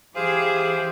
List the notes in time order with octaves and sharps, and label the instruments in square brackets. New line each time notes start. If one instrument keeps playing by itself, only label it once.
[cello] E3 G4 [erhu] G#4 [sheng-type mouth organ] C5 F5